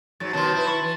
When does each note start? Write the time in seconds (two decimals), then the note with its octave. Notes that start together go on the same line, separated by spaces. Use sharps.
0.20 G#2 F#3 A6
0.33 B2 D#3 F#3 A5 C6
0.54 E4 B4
0.67 C#6 A6
0.82 E3